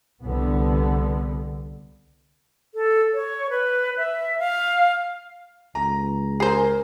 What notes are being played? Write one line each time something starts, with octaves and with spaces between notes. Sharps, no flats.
C2 D3 B3
A4
C#5
B4
E5
F5
C#2 A#5
G#4 A#4 C5 G#5 A#5 C7